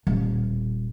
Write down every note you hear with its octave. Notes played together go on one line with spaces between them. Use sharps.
D#1